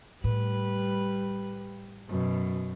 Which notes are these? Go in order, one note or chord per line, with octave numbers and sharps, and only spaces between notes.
A2 G3 B4
F#2 B2